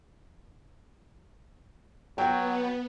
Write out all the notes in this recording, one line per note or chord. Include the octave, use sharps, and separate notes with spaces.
F#3 B3 G5